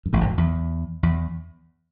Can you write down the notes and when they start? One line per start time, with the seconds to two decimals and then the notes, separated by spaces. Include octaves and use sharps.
0.06 F#2
0.13 A1 A2
0.21 G#1 G#2
0.30 F#2
0.37 E2
1.03 E2